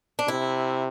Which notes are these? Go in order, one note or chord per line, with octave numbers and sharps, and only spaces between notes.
D4
C3 E4